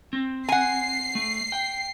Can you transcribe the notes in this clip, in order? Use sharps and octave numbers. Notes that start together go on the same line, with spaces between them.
C4
F#5 G#5 C7
A3
G5